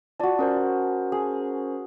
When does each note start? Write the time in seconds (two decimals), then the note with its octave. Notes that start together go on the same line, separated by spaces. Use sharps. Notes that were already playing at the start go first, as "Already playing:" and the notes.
0.20 F4 F#4 D5 A5
0.39 C#4 A#4 C5
1.12 G#4